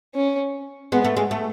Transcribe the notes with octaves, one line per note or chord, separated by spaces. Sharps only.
C#4
G#3 B3
A3
G#3
A3